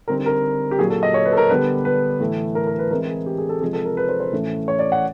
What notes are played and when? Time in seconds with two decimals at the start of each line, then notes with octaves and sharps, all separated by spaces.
0.08 D3 G3 C4 D#4 A#4
0.26 A#4
0.71 G4
0.79 A#2 F#3 A#3 G#4
0.90 A4
1.03 D#5
1.14 C#5
1.25 B4
1.32 A4
1.37 A#4
1.49 D3 G3 B3 D4 B4
1.85 B4
2.20 A2 E3 A3
2.55 A#4
2.67 A#4
2.79 B4
2.91 E3 G#3 C4 E4 A#4
3.08 G#4
3.26 G4
3.38 G#4
3.49 A4
3.61 C3 F3 G#3 G#4
3.73 A4
3.85 A#4
3.97 B4
4.09 C5
4.20 C5
4.32 A2 E3 A3 C#4 E4
4.68 C#5
4.79 D5
4.92 F#5